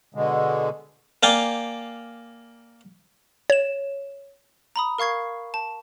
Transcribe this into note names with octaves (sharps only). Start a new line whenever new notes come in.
B2 D3 G#3
A#3 D5 F5 G5 G#5
C#5 E7
A#5 B5 D#6
A#4 F5 C#6 G#6 C7
A5